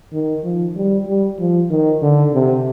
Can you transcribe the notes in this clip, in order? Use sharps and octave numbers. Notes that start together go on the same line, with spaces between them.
D#3
F3
G3
G3
F3
D#3
D3
C3